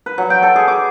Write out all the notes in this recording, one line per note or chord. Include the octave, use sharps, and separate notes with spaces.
B4
F#3
G5
A4
G#4
D6